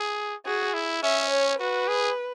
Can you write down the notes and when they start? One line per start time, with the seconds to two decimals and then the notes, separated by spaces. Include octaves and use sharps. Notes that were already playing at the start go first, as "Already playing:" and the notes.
Already playing: G#4
0.46 F#4 G#4
0.74 E4
1.03 C#4 E5
1.31 C#5
1.59 F#4 B4
1.88 G#4